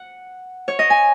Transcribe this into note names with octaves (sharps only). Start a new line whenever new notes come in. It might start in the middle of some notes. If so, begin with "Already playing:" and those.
Already playing: F#5
C#5
D#5
G#5